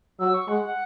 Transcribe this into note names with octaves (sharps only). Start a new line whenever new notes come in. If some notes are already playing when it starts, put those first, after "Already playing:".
F#3 E6
C#6
G#3 F#5
F#5